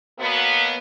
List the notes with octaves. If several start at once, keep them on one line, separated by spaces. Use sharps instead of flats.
B2 F#3 A#3 B3